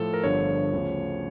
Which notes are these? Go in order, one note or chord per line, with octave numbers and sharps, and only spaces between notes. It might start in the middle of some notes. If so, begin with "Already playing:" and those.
Already playing: A2 F3 A4
A#4
G1 G2 D3 F3 C#5
D2 C#3 F3